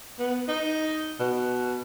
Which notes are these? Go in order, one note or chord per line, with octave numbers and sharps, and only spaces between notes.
B3
D#4
B2